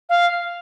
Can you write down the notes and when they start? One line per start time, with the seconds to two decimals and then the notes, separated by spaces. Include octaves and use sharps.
0.09 F5